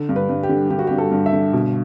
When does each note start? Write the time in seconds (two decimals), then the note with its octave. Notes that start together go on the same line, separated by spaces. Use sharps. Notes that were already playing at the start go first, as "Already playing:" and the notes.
Already playing: D3
0.09 G2
0.16 B4
0.29 G2
0.43 G4
0.49 D3
0.70 D3 G4
0.79 F#4
0.87 G4
0.91 G2
0.98 A4
1.11 G2
1.26 E5
1.33 D3
1.53 B2